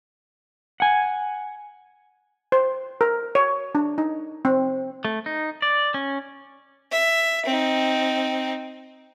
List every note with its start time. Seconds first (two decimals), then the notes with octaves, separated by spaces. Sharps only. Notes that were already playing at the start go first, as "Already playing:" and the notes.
0.80 F#5 G#5
2.52 C5
3.01 A#4
3.35 C#5
3.75 D4
3.98 D#4
4.45 C4
5.05 A3
5.26 D#4
5.62 D5
5.94 C#4
6.92 E5
7.46 C4 D#4